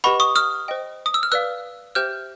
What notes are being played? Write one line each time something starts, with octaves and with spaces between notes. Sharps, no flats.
G4 B4 D#5 F#5 B5 C#6
C#6 D#6
D#6 F6
C5 D#5 G5
D#6
E6
F6
B4 D5 F5 E6 F#6
G4 C5 E5 G5 F6 G6